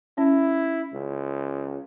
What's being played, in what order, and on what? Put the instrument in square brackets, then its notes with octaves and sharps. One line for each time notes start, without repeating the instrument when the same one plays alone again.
[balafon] C#4 [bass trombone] E4
[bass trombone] C#2